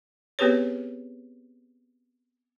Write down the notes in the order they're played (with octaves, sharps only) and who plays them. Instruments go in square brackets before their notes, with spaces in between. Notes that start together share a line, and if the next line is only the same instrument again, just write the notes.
[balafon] B3 C4 G4 G#4 B4 C#5